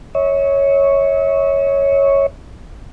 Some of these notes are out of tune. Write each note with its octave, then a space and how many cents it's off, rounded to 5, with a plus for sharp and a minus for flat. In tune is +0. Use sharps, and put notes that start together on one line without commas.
C#5 +0 E5 -40